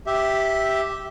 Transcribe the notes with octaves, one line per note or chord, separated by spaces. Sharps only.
G4 E5